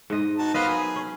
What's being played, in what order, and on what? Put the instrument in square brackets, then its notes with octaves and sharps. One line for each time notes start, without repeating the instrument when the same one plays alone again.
[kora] G#2 D#5
[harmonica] D#4 F#4 A5
[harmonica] A#3 C5 F5 [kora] B3 B4 D#5
[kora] F#3 [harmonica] G#4
[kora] C#4